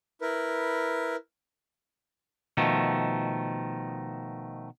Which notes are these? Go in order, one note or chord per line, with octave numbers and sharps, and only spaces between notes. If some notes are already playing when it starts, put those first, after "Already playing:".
E4 A#4 B4
B2 D#3 F3 A3